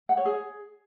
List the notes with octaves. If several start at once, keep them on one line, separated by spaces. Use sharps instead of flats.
F#5
C#5
G#4